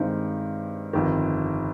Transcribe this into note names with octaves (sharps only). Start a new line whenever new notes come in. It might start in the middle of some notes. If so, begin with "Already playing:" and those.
Already playing: G2 D#3 G#3 C4 D#4
G1 F2 D#3